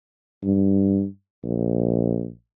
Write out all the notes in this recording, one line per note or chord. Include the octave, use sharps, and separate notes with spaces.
G2
A#1